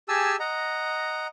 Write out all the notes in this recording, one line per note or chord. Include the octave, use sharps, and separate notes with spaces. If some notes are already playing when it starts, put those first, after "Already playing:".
G4 G#4 G#5 A5 E6
D#5 F#5 A#5